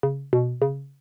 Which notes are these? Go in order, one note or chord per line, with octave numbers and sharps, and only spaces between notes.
C#3
B2
C#3